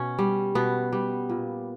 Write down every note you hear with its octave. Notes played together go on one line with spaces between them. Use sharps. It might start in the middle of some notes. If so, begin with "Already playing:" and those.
Already playing: B2 C#4
G3
B2 B3
G3
A#2